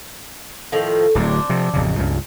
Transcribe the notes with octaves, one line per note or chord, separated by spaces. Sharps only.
A2 D#3 F3
D1 D2 F#3 C4 D4
C3 F3
A1 F2 C#3
C#2 G2 C#3